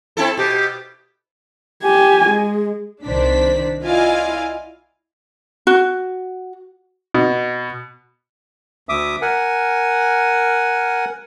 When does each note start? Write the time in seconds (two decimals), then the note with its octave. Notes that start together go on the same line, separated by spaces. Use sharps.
0.17 C4 E4 A4
0.37 B2 G4
1.84 G4 G#5
2.29 G#3
3.06 C2 D#3 D4 C5 B6
3.86 E4 F4 D5 D#5 F5 G#5
5.67 F#4
7.14 B2
8.89 D2 E5 D6 D#6
9.22 A#4 F#5 G#5